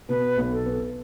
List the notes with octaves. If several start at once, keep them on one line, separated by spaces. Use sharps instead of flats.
B2 B4
B1
A4
B3